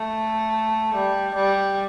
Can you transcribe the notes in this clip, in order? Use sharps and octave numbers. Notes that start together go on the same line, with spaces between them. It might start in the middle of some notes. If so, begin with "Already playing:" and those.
Already playing: A3
G3
G3